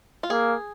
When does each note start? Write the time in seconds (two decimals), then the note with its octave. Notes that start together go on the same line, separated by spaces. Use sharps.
0.23 F4
0.30 A#3 G#4